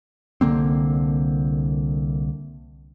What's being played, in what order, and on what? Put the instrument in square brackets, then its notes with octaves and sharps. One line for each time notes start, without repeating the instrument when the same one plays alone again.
[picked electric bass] C2 D3 A#3 C4